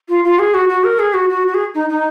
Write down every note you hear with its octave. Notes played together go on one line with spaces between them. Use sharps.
F4
F4
G#4
F#4
F#4
A#4
G#4
F#4
F#4
F#4
G#4
D#4
D#4